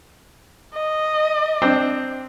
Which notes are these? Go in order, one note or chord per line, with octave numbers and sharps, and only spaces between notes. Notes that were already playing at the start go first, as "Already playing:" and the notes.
D#5
C4 D4